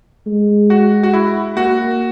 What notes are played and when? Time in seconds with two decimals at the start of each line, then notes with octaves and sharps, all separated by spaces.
0.27 G#3
0.70 F#4
1.03 F#4
1.13 E4
1.56 A#3 F#4